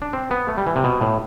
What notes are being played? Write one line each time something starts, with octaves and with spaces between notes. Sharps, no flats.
D4
C4
B3
A3
G3
E3
C3
B2
A2